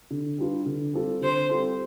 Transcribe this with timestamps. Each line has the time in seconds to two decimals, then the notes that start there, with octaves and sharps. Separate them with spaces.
0.11 D3
0.38 G3 D4 F4 B4
0.66 D3
0.93 G3 C4 F4 A4
1.21 D3 C5
1.49 G3 C4 F4 A4